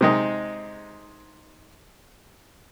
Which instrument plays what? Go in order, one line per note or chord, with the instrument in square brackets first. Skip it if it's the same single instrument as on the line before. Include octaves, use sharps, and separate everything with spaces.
[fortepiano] C3 G#3 D#4